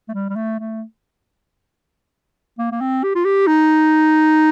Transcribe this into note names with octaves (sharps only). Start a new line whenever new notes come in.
A3
G3
G3
A3
A3
A#3
A#3
C4
G4
F4
G4
D#4